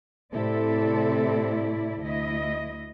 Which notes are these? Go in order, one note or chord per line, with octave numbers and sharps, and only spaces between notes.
A2 C3 C4 E4 A4 D5
D2 E4 D#5